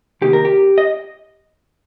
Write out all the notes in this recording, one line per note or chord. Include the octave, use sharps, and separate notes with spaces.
C3 D#3 A#3 G4
A#4
G4
D#5